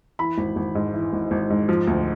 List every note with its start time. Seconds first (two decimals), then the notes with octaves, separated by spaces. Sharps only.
0.19 E3 B5
0.38 G#1
0.56 G#1
0.75 G#2
0.94 E3
1.13 G#1
1.31 G#1
1.50 G#2
1.69 F3
1.87 D2